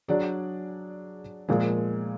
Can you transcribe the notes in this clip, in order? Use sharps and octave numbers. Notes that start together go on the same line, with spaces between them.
F#3 D4 G#4 D5
A#2 F3 G#3